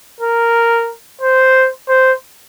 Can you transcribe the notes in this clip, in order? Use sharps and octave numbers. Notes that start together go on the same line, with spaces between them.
A#4
C5
C5